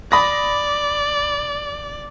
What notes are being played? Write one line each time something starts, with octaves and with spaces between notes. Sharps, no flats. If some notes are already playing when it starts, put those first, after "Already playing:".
D5 B5 D#6 A#6